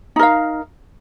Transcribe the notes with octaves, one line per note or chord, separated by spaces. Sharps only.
D#4 A#4 F5